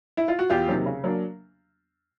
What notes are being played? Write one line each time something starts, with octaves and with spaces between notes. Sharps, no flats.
E4
F4
F#4
E2 F4 G4
C3 D#3 F#3 A#3
C#3
F#3 A#3 D4